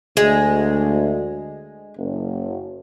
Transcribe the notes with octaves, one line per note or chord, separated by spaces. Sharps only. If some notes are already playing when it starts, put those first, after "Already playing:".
D2 G#3
F#1